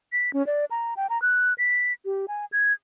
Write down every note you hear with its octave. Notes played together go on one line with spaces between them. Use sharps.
B6
C#4
D5
A#5
G5
A#5
F#6
B6
G4
G#5
G#6